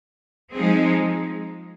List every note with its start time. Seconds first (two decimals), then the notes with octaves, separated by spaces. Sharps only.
0.54 F3 G#3 C4 D#4 G#4